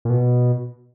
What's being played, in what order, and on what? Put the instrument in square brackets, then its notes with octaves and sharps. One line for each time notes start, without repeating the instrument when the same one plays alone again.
[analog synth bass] A#2
B2